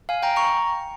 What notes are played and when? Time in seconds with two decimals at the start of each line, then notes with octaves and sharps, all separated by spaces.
0.09 F5 G#5
0.23 G5 A#5
0.36 A#5 C#6